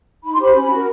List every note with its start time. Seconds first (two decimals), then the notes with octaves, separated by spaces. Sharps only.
0.24 D#4 B5
0.33 C6
0.39 G4 C5 B5
0.55 C#4
0.70 F#4 A#4